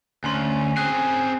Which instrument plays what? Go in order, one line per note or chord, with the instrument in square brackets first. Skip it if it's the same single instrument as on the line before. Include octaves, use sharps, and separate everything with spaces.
[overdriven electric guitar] D2 [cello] C#4 [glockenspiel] G#5 C6
[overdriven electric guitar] C4 G#4 [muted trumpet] G#5 [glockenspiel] F#6